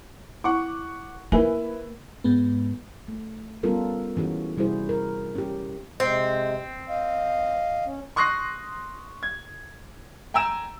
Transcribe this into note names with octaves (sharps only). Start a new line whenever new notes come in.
E4 F#5 C#6 D6
A#3 E4 A#4 B4 G#5
G#2 G#3 B3
A3
G3 B3 C#4 F4 A4 A#4
E3 C#4 F#4 G#4
C3 G3 E4 F#4 G#4 C5
A#4
C#4 G4
C3 G#3 C4
D#5 F5
C#4
C6 C#6 D#6 F#6 A#6 C7
G#6
G5 G#5 A#5 E6 D7 E7